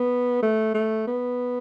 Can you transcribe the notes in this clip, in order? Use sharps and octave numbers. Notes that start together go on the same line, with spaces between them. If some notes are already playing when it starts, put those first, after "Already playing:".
Already playing: B3
A3
A3
B3